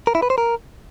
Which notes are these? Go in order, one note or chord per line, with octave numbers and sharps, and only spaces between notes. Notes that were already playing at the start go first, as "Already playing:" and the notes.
A#4
E4
B4
C5
A#4